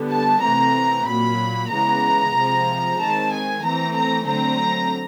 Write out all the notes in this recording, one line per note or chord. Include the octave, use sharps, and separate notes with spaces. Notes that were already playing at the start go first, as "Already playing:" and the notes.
Already playing: D3 G3 B3
A5
C3 E3 A3 C4 A#5
A#2 F#3 A#3 B5
C#3 E3 G#3 B3 A#5
C3 F3 G#3 C4
D#3 G#3 C4 A5
G#5
E3 A3 C4 A#5
A#5
D3 F#3 A3 C4 A#5